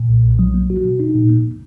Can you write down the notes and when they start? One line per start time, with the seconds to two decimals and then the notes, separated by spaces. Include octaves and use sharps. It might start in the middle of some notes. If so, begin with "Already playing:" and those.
Already playing: A#2
0.09 B1
0.24 B1
0.39 F#3
0.54 A#3
0.70 F#4
0.85 B2
1.00 D#4
1.15 A#2
1.30 A#3